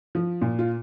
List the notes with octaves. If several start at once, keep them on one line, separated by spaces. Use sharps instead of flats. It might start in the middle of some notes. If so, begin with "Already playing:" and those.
F3
A#2
F4